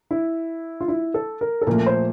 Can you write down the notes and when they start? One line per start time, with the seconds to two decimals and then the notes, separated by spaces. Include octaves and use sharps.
0.11 E4
0.81 F4
0.88 E4
1.14 A4
1.41 A#4
1.61 A4
1.67 A#2 F3 A3 A#4
1.86 C5